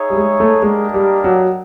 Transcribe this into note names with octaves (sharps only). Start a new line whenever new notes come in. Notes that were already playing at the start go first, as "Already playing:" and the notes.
Already playing: D#4 G#4 C#5 E5
G3
G#3
A3
G#3 A#3 D4 G4 A#4 D#5
G3
F#3